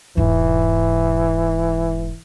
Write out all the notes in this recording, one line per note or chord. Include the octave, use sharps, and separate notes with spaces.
E1 G#2 E3